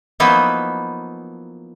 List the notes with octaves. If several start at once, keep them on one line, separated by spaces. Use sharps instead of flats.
F3 F#3 A#3 B3 D#4 E4